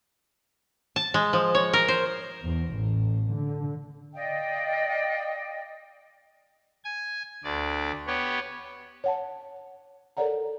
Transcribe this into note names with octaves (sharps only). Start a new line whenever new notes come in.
A5
G#3
F3
C#5
A#4
C5
E2
A1
D3
D5 D#5 F5 G5
G#5
D2 D5
B3 G4 C#5
C#5 F#5 A5
A4 A#4 C#5 D5 F#5 A#5